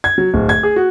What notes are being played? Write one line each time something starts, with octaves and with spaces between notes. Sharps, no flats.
G#6
F#3
D1
G#6
G#4
F#4